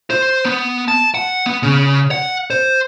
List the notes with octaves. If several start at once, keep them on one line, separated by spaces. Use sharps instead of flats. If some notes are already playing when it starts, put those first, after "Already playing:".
C5
B3
A5
F#5
B3
C#3
F#5
C5